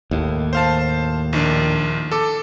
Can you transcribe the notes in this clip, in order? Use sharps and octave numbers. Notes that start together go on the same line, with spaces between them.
D#2 A2
C5 F5 A5
A#1 D#3 D4
A4 D6